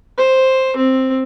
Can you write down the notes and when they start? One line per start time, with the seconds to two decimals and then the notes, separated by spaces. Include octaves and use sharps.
0.18 C5
0.76 C4